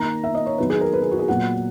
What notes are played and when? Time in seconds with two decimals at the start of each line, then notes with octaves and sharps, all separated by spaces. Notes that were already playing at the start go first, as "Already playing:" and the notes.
Already playing: D#3 A#3 A#5
0.24 E5
0.35 D#5
0.46 C#5
0.58 D#3 F#3 B3 B4
0.70 G#4
0.81 A#4
0.93 B4
1.02 G#4
1.11 F#4
1.19 G#4
1.28 A#2 F#3 B3 F#5